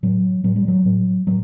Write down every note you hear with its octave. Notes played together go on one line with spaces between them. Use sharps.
A2 F#3
A2 F#3
G3
F#3
A2
A2 F#3